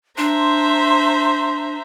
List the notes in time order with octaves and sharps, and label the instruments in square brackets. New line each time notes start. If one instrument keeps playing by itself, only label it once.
[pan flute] D4 [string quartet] C5 E5 A#5 [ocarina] C6